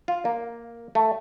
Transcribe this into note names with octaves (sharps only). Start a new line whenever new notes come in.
F4
A#3
A3